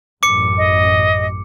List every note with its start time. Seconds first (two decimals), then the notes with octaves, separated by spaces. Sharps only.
0.23 A1 F#2 D6 C#7
0.58 D#5